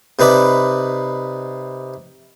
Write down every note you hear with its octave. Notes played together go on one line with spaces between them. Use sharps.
C3 D#4 B4 D5 B5